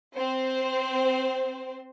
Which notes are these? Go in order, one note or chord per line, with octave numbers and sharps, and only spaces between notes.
C4 C5